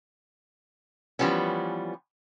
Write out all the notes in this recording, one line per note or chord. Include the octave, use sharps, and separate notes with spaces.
E3 F3 G3 B3 C#4